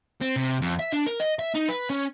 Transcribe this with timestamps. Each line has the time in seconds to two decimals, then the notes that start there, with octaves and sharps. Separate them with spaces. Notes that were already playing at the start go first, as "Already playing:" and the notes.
0.21 C4
0.36 C3
0.62 F2
0.79 E5
0.93 D4
1.07 A#4
1.20 D#5
1.39 E5
1.55 D#4
1.69 B4
1.90 C#4